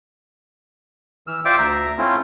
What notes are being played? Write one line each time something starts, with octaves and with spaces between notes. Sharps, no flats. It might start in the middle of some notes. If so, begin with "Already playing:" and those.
E3 E6 F6
F4 C5 D5 E5 G5 D6
D2 E5 A#5
A3 C4 C#4 E4 F4